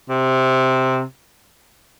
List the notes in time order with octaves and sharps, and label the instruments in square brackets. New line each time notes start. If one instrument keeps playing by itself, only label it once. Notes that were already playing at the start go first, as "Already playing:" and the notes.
[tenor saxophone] C3